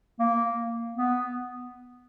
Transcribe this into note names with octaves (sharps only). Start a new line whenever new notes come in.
A#3
B3